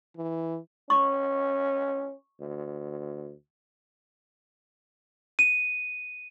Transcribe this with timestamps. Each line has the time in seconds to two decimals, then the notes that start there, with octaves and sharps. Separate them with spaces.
0.17 E3
0.90 C#4 C#6
2.41 D2
5.39 D#7